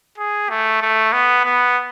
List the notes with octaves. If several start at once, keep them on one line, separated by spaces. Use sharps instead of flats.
G#4
A3
A3
B3
B3